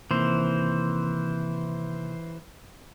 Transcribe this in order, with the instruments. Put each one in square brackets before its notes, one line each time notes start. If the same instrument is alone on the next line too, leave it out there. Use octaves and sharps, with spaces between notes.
[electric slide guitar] C3 D#3 A#3 [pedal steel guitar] E3 C5